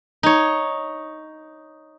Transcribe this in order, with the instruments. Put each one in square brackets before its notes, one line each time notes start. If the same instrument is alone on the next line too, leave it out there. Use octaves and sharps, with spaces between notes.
[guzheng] D#4 C#5